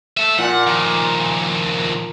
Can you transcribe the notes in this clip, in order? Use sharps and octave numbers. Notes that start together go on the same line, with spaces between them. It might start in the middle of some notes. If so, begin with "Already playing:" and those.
A4 E5
A#2 F#5
D#3 F3